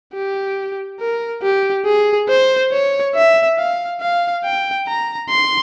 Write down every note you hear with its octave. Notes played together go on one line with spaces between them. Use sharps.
G4
A#4
G4
G#4
C5
C#5
E5
F5
F5
G5
A#5
C6